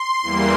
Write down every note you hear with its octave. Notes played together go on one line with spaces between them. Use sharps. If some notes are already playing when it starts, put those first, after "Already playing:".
Already playing: C6
E2 E3 G3 A#3